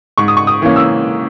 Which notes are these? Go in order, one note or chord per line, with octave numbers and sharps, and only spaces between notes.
G#2 C#6
D#6
C#6
D#6
E3 A#3 C#4
E6